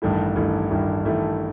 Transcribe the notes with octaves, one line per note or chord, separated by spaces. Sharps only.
A1 G2 D#3 A3 E4
A1 G2 D#3 A3 E4
A1 G2 D#3 A3 E4
A1 G2 D#3 A3 E4